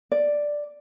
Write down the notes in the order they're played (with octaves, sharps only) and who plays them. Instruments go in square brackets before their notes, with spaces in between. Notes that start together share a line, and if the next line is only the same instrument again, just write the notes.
[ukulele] D5